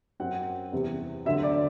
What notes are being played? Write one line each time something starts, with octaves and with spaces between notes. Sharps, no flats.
F#2 F#3 C4 F#5
E2 C3 G3 C4
D2 D3 F#3 E5
D5